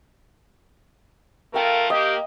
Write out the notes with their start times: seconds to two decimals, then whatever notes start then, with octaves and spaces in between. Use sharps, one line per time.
1.54 A3 F4 A#4 F5 G5
1.90 A#3 G4 D#5